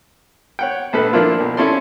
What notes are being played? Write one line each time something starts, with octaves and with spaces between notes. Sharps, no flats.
C#5 F#5 G5
A#1 A3 A4 B4
F3 A#3 D4 E4 F4
B1
C#4 E4 A4 D5 C6